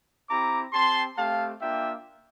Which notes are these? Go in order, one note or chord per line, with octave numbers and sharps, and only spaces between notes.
C4 E4 G4 A#5 D6
C4 G4 A5 C6
A3 C4 G4 F5 A5
A#3 D4 F4 E5 G5